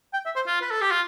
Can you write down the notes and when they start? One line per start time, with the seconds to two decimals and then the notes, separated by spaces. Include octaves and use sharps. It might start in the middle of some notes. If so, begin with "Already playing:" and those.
0.13 G5
0.25 E5
0.36 C5
0.47 F4
0.61 B4
0.71 A4
0.81 G4
0.91 F4